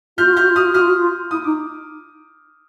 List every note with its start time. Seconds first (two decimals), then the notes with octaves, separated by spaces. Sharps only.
0.17 F4 F6 G6
0.26 F#4
0.33 F4
0.37 F6 G6
0.42 F#4
0.50 F4
0.56 F#4 D#6 F6
0.65 F4
0.73 F#4 D#6 F6
0.81 F4
0.89 F#4
0.97 F4
1.31 E4 D#6
1.44 D#4 D6